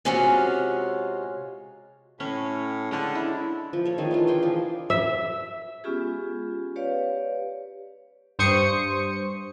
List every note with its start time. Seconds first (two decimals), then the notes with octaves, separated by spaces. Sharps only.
0.05 C3 G#3 C#4 F4 F#4
2.20 A2 C#4
2.91 D3 G#3 C#4 D4
3.15 E4
3.73 F3
3.85 A4 C#5
3.98 D#3 A3 G#4 C#5
4.11 E3 D4 F4
4.27 G#4 G5 C6 C#6
4.43 F3 D4
4.90 E5
5.84 G#3 B3 C#4 F4 G4 G#4
6.76 G4 B4 C#5 D5 F5
8.39 G2 C5 C#6 D#6 C#7